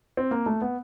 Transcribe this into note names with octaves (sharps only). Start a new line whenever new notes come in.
C4
A#3
A3
B3